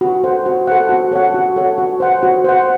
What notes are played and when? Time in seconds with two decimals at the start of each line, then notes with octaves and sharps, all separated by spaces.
0.01 F#4
0.24 A4 C5 F#5
0.46 F#4
0.68 A4 C5 F#5
0.89 F#4
1.12 A4 C#5 F#5
1.34 F#4
1.56 A4 C#5 F#5
1.78 F#4
2.00 C5 F#5
2.23 F#4
2.44 C5 F#5